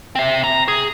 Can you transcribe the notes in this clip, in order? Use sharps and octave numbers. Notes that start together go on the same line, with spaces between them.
C4 E5
A#5
G#4